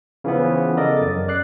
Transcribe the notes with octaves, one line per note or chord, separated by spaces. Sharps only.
C#3 E3 F3 B3
A4 A#4 D5 D#5
F#2 A6
D5 F#6 C7